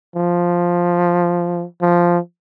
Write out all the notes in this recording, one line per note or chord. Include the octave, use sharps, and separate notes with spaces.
F3
F3